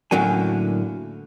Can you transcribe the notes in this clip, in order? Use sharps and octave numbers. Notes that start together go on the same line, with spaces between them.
A2 D3 F#3 A#3 C#4 G#5